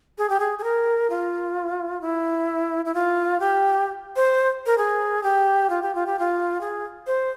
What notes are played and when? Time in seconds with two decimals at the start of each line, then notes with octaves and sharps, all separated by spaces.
0.18 G#4
0.30 G4
0.40 G#4
0.59 G#4
0.64 A#4
1.10 F4
2.01 E4
2.85 E4
2.94 F4
3.40 G4
4.16 C5
4.66 A#4
4.78 G#4
5.23 G4
5.70 F4
5.82 G4
5.95 F4
6.06 G4
6.19 F4
6.61 G#4
7.07 C5